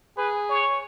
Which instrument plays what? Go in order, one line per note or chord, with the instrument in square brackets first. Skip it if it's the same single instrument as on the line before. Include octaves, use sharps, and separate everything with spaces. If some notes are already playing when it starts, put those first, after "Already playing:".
[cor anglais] G#4 [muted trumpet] B4
[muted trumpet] C#5